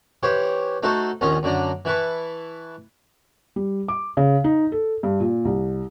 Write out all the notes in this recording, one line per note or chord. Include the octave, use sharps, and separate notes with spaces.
E3 G4 C5 C#5
A3 D#4 F#4 A4 C5
A#1 D#2 C#4 F4 D#5
F#2 D3 D4 A#5
E3 E4 B4 A5 C#6
G3
D6
C#3
D#4
A4
G2
A#2
C2